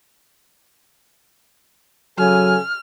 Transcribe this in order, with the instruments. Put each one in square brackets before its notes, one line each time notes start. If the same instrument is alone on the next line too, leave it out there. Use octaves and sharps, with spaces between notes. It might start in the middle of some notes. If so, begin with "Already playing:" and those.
[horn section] C#3 G#5 [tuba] F#3 [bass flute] A4 [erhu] F6